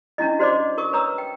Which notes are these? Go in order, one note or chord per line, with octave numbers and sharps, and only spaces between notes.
C#4 D4 E4 D#5
F#4 C5 D5 D#5 D6
A#4 C#6 D#6
B4 C#5 A#5 D#6 E6
G5